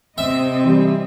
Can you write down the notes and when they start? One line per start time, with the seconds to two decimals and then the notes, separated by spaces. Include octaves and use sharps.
0.18 C3 C4 D#5 E5
0.64 E3 G3